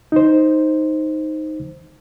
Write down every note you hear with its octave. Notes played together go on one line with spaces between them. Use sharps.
D#4 C5